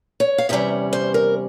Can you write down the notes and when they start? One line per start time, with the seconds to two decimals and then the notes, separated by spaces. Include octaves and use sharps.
0.20 C#5
0.38 F5
0.49 E2 C3 G3 C#4 E5
0.93 C5
1.14 A#4